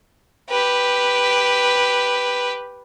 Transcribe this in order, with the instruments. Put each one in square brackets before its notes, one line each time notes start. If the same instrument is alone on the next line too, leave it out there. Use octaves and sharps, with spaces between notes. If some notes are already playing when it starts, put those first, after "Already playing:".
[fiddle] G4 B4